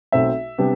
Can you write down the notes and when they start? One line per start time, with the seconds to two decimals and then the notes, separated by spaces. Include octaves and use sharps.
0.12 B1 B2 A3 C4 E5
0.58 C3 G3 B3 D4